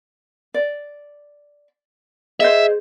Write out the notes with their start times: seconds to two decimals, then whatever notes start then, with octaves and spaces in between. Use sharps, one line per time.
0.54 D5
2.40 G#4 C5 C#5 D#5 E5